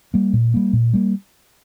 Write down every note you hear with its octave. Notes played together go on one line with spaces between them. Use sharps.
G3 A#3
A#2
G3 A#3
A#2
G3 A#3